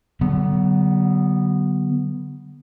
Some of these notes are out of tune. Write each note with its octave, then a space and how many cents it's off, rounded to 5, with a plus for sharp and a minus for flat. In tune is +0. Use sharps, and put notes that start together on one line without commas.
D3 +0 F#3 +40 B3 +0